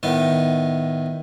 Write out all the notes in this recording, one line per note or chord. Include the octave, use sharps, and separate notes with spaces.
A2 D#3 B3